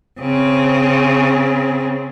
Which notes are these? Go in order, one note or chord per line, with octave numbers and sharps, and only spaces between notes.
C#3 C4